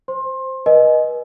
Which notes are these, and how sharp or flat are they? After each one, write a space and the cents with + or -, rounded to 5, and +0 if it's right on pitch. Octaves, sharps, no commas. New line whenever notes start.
C5 +0 C6 +25
B4 -40 D#5 +0 G#5 +25